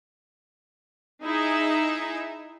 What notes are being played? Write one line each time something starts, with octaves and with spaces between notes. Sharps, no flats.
D#4 E4 G#4 E5